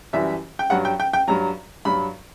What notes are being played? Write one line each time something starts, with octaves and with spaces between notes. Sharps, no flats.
F#2 E3 G3 E5
G5
G2 F#3 F#5
G5
G5
G5
G2 F#3 A#5
G2 F#3 B5